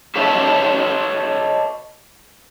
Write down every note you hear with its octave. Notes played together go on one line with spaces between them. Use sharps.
A4 B4 C#5 D#5 E5